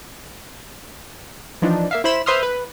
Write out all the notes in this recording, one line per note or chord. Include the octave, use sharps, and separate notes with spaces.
E3 F3 D4 D#4
A#3 E5 F5
E4 C5 B5 E7
B4 C5 E5 C6 D#6 F6
B4